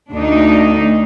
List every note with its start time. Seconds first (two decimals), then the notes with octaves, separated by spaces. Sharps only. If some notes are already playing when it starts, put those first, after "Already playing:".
0.12 D2 D4 D#4